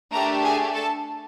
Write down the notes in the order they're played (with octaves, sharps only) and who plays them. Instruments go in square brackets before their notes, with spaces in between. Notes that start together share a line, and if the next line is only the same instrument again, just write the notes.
[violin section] A3 D4 G4 A#4 A#5
G#4 G#5
A4 A5